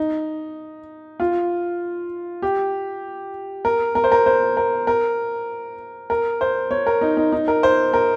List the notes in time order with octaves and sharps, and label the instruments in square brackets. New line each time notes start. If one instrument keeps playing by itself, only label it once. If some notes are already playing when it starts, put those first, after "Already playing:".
Already playing: [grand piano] D#4
F4
G4
A#4
A#4
C5
A#4
C5
A#4
A#4
A#4
C5
C#5
A#4
D#4
D#4
D#4
A#4
C5
A#4